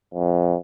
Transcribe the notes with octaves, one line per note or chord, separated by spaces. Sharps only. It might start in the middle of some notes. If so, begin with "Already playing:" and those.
F2